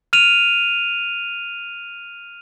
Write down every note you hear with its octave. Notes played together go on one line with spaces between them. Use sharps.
F6 D#7 F7